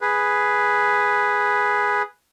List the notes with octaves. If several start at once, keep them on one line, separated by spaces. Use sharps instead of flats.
G#4 B4